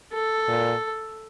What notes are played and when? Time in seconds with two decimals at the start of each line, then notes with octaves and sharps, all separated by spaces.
0.13 A4
0.48 A#2